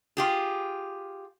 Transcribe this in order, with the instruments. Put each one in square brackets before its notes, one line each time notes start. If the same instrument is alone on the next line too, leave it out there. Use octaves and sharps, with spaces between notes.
[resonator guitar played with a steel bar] F4 G4 G#4